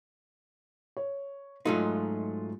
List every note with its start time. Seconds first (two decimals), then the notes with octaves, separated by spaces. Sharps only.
0.97 C#5
1.65 G#2 F#3 A3 D#4 F4